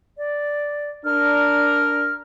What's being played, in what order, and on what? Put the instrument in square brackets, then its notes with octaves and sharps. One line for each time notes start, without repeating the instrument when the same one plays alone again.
[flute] D5
[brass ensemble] D4 A#4 [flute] F6